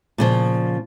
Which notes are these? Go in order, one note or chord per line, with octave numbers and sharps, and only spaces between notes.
A#2 C#3 F3